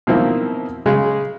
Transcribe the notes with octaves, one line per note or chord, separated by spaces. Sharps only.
B2 D#3 F3 A#3 C4 E4
C#3 G#3